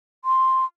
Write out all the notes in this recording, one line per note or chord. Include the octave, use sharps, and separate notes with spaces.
C6